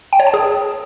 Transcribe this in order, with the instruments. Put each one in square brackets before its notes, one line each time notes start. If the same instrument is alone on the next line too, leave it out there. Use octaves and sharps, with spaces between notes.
[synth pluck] G5
C#5
A5
G#4